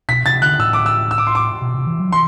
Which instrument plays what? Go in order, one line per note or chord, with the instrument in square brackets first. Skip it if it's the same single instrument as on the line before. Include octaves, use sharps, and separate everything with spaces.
[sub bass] B2 [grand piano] B6
[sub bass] C3 [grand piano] A6
[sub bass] D3 [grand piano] F#6
[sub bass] A2 [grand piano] E6
[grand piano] D6
E6
E6
D6
C6
D6
[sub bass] B2
C3
E3
F#3
[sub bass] E3 [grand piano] C6